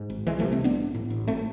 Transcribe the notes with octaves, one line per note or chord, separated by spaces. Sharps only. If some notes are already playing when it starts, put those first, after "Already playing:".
Already playing: G#2
G#1
C2 E3 G#3
F3 A3
C3
A3 C4
C2 B3 D4
A1
A2
A1
G#1 A3 C4